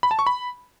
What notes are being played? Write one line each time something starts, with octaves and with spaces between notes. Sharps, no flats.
B5
A5
C#6
B5